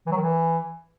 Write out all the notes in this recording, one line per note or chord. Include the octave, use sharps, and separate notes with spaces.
E3
F#3
D#3
E3